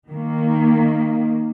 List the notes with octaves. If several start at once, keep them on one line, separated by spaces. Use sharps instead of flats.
D#3 A#3